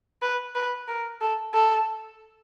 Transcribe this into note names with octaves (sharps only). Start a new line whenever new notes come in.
B4
B4
A#4
A4
A4